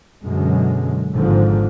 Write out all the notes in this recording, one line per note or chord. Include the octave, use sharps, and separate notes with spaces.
F#2 B2 D3 G#3
G#1 G#2 D3 F3